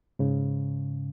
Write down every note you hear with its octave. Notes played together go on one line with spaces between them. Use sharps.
G#2 C#3